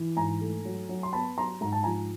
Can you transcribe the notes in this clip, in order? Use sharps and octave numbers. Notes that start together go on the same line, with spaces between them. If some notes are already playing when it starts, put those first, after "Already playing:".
Already playing: E3
G#2 G#5 A#5
A3
F#3
F#3
C6
B3 A5 B5
F#3 A#5 C6
G#2 A#5
A5
F3 G#5 A#5